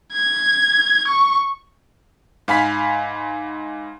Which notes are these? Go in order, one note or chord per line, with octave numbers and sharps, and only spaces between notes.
G#6
C#6
G#2 F5 G#5 B5 B6